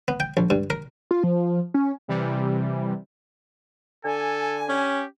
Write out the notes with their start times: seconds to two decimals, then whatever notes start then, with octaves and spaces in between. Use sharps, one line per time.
0.08 B3
0.20 G5
0.37 A#1
0.50 G2
0.70 A#4
1.11 F4
1.23 F3
1.74 C#4
2.08 C3 E3 G3
4.05 D3 A4 G#5
4.69 C#4 G4